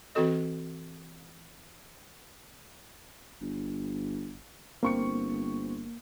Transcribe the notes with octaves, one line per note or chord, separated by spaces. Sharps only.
E3 C4 F#4 A4 D#5
G1
G1 A#3 C4 C#6 C#7